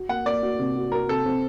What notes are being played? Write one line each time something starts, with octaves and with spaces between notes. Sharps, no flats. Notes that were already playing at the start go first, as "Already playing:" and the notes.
Already playing: F#4
A#3 F#5
A#3 D5
F#4
C3
F#4
F#4 A#4
C3 A4
C4